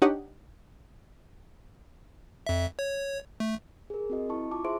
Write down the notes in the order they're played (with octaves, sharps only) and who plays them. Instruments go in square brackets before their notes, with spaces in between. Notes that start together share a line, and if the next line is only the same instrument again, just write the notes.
[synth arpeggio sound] D4 D#4 G4 C#5 D#5 F#5
[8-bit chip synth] F2 E5
C#5
A3
[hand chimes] G#4 A#4
C4 F#4 D#5
E4 A5 C#6
F4 A5 D6
G#4 C5 E5 C6 D7